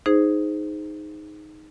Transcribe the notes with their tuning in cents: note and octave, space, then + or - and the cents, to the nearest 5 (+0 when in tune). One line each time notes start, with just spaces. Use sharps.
D#4 +0 G#4 +0 C5 -15